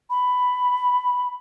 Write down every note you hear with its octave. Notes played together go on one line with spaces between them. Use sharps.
B5